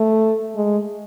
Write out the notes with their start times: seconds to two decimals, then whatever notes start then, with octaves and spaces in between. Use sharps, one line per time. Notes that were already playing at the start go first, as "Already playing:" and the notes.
Already playing: A3
0.56 G#3